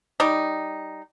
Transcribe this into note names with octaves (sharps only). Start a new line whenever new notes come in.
G3 D#4